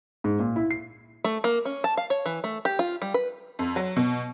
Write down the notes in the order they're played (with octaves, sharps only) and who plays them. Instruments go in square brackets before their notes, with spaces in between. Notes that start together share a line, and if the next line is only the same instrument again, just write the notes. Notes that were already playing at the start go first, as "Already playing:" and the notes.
[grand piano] G#2
A#2
E4
C7
[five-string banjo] A3
A#3
C#4
A5
F5
C#5
E3
A3
G4
F4
G3
B4
[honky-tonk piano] F2
F#3
B2